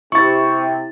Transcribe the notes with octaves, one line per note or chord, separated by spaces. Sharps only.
C3 E4 C#6 A6